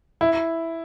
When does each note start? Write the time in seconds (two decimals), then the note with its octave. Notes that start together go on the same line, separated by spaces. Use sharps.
0.21 E4